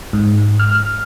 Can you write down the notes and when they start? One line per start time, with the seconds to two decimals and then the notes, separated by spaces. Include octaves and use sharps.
0.13 G#2
0.60 F6